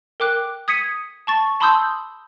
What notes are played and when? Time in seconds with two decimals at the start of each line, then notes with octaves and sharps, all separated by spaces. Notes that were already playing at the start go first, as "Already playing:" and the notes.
0.20 A#4 G5 D6 F#6
0.68 D#6 G#6 B6 C#7 D#7
1.27 A5 C#6 A6
1.60 A5 B5 C6 D#6 E6 G6